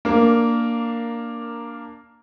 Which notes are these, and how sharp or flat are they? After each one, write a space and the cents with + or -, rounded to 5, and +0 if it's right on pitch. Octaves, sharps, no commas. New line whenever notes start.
A#3 -5 D4 +0 A#4 +0